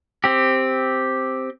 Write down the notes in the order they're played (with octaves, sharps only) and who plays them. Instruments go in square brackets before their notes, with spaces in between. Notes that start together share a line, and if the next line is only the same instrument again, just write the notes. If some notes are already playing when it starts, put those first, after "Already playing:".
[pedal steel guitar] C4 G4